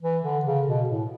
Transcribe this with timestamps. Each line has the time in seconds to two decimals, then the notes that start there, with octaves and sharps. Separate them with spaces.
0.02 E3
0.23 D3
0.45 C#3
0.67 B2
0.89 A2